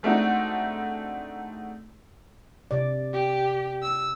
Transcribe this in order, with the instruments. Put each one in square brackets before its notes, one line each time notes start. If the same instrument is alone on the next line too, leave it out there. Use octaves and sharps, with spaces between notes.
[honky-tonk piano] G#3 A3 C4 D4 D#4 F#4
[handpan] C3 D5
[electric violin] G4
E6